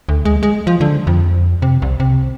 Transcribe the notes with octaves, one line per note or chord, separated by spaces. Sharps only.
D2
G#3
G#3
F3
D3
F2
C3
C2
C3